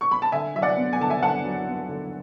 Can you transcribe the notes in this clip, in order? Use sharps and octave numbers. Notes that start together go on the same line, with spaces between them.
C#6
B5
A5
D3 E5 G#5
F#3 E5
D5 F#5
B3
G#5
D3 A5
E5 G#5
D3 F#5 A5
F#3
B3
D3